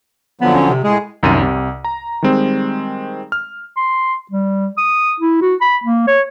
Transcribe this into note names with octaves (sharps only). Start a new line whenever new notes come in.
D3 F3 F#3 B3
C#4
C3
A2 G#3 G#4
C2 F#2 D#3 D#7
C2 C3
A#5
D#3 G3 G#3 C4
F6
C6
G3
D#6
E4
F#4
B5
A#3
C#5